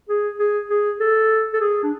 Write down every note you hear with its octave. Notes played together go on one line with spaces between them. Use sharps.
G#4
G#4
G#4
A4
A4
G#4
D4